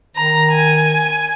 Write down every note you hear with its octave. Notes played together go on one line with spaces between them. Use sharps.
D#3 A#5
G#5